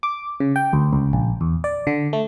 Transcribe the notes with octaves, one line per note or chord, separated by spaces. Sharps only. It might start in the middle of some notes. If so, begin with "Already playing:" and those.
D6
C#3
G5
D2
C#2
A#1
E2
D5
D3
A3